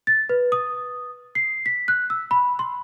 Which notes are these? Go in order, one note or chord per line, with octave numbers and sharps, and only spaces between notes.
A6
B4
D#6
C7
B6
F#6
E6
B5
C6